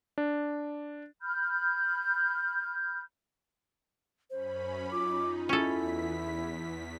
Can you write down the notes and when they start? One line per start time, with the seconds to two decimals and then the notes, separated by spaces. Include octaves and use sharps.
0.18 D4
1.21 B5 F6 G6
4.30 F#2 C#4 C5 B5
4.92 D#4 F4 D6
5.49 E2 C#4 E4 A4 B6